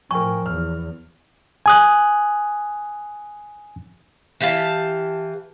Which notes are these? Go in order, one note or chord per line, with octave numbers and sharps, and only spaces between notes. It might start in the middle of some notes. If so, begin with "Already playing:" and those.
A2 F3 A#4 G5 G#5 C#6
E2 F6
G#5 D#6 F#6
E3 G4 F5 A5